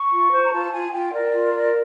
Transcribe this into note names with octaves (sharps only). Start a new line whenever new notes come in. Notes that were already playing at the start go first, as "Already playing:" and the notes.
Already playing: C#6
F4
C5
A#5
F4 A5
F4 G#5
F4 G5
A#4 D5
F4
A#4